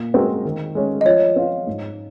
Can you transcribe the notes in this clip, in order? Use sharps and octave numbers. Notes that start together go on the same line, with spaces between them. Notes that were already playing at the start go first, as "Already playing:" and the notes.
Already playing: A#2
G#3 C4 F#4 A#4
D#3
G#3 C#4
D#5
F3 C#5
C4 F4
G#2